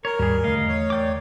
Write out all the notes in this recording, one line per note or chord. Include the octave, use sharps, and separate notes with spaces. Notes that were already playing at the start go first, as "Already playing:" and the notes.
A#4 C#5
D#2 G#2 G3 G#4
E2 D3 A3 D#5 F5
C#5
D5 G5 D6